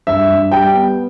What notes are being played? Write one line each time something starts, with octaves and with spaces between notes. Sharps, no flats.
G2 E5
G2
G3 G5
B3